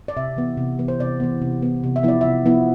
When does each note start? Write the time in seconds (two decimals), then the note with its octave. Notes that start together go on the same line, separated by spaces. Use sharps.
0.08 D5
0.17 C3 E5
0.37 E3 B3
0.57 C3
0.79 E3 B3
0.88 C5
1.00 C3 D5
1.20 E3 B3
1.41 C3
1.62 E3 B3
1.84 C3
1.96 E5
2.03 F3 B3 E4 D5
2.21 C3 E5
2.46 F3 B3 E4